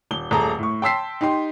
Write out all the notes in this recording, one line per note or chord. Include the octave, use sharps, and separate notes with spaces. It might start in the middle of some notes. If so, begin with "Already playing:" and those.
D#1 G7
D#1 A3 G#4 A5 A#5
A2 C#6
G5 A5 C6 E6 B6 C7
D#4 G4 C6